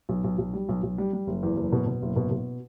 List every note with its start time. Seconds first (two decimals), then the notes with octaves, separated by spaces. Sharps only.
0.09 B1
0.24 B1
0.38 B1
0.54 G3
0.69 B1
0.83 B1
0.98 G3
1.13 G3
1.27 F#1
1.43 E2
1.57 F#1
1.72 B2
1.86 B2
2.02 F#1
2.16 B2
2.31 B2